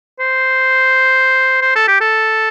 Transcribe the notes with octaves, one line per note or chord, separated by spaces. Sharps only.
C5
C5
A4
G4
A4